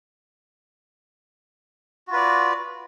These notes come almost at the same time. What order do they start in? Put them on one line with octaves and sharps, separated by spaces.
F#4 F4 B4 D5